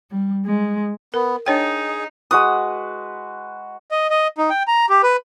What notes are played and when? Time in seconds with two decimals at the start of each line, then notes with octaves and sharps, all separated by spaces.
0.10 G3
0.46 G#3
1.14 B3 A#4
1.46 D4 D#4 G#4 C#5 G5
2.31 G#3 F#4 B4 D#6
3.91 D#5
4.10 D#5
4.38 D#4
4.50 G5
4.68 A#5
4.89 G4
5.03 B4